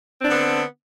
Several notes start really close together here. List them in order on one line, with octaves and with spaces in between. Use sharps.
C4 D4 D3 B3